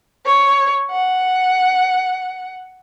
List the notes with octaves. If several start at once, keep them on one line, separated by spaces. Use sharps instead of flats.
C#5
F#5